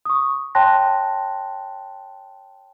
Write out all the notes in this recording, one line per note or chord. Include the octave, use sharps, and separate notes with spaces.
C#6 D#6
C#5 G5 A5 C6 F#6 A#6